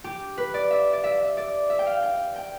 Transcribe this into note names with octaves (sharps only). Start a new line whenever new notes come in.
G4
B4
D5
E5
D5
E5
E5
D5
E5
G5
F5
G5
G5